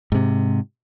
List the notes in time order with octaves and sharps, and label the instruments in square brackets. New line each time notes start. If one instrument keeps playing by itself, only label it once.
[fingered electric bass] G#2 C3